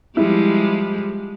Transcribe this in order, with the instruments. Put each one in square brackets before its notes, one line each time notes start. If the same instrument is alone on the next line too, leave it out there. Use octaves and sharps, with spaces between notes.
[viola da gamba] F3 G3 G#3 [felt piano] E4